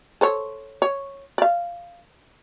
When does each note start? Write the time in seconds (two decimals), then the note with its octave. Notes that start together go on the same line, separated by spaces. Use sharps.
0.21 A4 C5 C#5
0.82 C#5
1.38 D5 F5